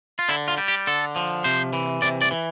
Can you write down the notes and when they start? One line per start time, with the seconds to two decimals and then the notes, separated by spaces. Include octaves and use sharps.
0.19 F4
0.29 D3 E4
0.48 F4
0.58 G3
0.68 G4
0.87 D3 A4
1.16 F3
1.44 C3 C5
1.73 E3
2.02 C3 D5
2.22 D5
2.31 E3